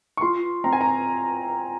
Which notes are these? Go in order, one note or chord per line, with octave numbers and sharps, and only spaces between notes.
C#6
F4 C6
C4 A#5
G#5
A#5